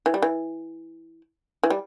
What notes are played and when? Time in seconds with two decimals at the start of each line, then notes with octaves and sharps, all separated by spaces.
0.06 E3
0.14 G3
0.22 E3
1.63 E3
1.70 G3